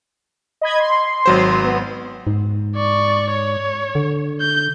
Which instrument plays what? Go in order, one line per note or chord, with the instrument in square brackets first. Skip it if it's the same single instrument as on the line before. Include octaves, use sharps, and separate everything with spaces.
[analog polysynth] D#5 B5 G#6
C6
[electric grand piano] G#1 F#3 C5
[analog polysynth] B3
[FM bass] G#2
[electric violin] D5 C#6
C#5
[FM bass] D3
[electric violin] G6